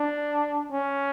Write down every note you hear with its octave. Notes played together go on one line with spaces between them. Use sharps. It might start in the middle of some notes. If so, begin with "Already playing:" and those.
Already playing: D4
C#4